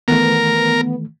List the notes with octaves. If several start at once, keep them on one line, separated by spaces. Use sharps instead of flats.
D#3 E3 A3 B3 A#4